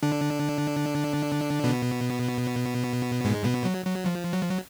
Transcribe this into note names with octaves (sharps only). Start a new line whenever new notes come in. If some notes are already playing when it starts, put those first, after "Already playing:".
D3 D4
B2 B3
G#2 G#3
B2 B3
F#3
F#3
F3
F#3
F3
F#3